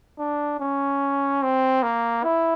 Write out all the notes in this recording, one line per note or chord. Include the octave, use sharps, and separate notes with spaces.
D4
C#4
C4
A#3
E4